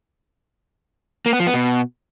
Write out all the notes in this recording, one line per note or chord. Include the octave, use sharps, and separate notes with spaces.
A#3
B3
F3
B3
B2